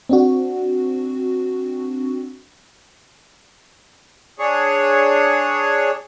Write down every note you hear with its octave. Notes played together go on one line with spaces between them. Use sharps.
C4 D4 F#4
D4 G#4 C#5